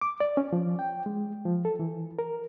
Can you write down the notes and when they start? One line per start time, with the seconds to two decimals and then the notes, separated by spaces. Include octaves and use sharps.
0.01 D6
0.20 D5
0.37 C#4
0.53 F3
0.79 G5
1.06 G#3
1.45 F3
1.65 A4
1.79 E3
2.19 A#4